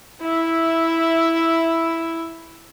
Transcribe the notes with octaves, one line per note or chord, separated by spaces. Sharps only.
E4 E5